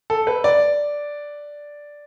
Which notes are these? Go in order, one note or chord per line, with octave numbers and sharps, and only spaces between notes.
A4
B4
D5